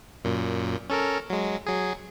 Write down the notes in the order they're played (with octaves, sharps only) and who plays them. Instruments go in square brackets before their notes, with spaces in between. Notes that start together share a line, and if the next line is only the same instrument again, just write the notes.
[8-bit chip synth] F#2 A#2
C#4 A4 A#4
F#3 G#3
F#3 G#4